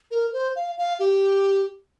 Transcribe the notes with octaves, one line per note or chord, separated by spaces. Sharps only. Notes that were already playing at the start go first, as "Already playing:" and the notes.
A#4
C5
F5
F5
G4